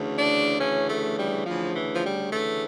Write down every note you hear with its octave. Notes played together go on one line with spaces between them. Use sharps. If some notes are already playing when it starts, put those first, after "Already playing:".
Already playing: D2 C#3 E3
D4
D2 C#3 E3 C#4
A3
G3
D2 C#3 E3 F3
E3
F3
G3
D2 C#3 E3 A3